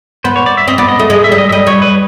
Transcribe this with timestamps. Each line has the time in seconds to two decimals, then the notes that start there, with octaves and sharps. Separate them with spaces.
0.24 B3 C5
0.36 C#5
0.46 D5
0.57 E5
0.68 C4 D#5
0.78 B3 D5
0.89 D#5
0.99 A3 D#5
1.10 G#3 D#5
1.24 E5
1.32 G3
1.38 D#5
1.49 E5
1.52 G3 D#5
1.67 G3 C#5
1.82 B4